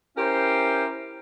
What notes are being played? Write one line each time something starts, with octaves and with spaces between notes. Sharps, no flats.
C#4 E4 G4 A#4 C5